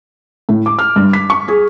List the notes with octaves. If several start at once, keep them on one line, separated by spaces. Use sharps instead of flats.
A2
D6
F6
G2
B6
C#6
G#4